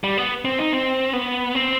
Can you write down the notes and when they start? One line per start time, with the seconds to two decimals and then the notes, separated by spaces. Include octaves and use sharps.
0.04 G3
0.18 B3
0.45 C4
0.59 D#4
0.73 C4
1.13 B3
1.55 C4